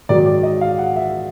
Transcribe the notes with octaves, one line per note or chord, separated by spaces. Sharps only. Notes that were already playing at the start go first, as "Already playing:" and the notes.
G#2 D#3 F#3 D5
D5
D#5
F5
F#5
E5